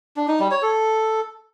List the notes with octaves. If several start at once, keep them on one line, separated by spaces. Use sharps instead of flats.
D4
D#4
G3
C#5
A4